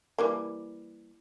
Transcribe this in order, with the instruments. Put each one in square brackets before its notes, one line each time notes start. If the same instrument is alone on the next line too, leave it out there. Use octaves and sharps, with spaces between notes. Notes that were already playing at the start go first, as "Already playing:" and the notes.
[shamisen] E3 G3 A#3